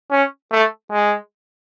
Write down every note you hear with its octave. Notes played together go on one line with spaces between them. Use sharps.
C#4
A3
G#3